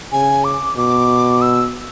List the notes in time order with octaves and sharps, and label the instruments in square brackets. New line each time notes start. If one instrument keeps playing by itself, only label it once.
[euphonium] C#3 [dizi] G#5
[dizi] D6
[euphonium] B2 [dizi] D6
[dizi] E6